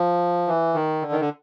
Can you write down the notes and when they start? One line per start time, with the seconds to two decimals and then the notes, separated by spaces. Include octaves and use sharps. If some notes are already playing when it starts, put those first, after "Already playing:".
Already playing: F3
0.47 E3
0.75 D#3
1.02 D3
1.12 D#3
1.20 D3